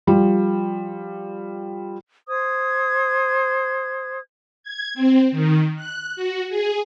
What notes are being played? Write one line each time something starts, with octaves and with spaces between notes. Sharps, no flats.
F3 G3
C5 D#6 G#6
G#6
C4
D#3
F#6
F#4
G#4